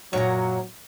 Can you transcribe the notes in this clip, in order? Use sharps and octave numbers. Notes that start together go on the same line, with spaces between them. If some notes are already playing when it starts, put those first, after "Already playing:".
F#2 A#2 F#3 C#5 A#5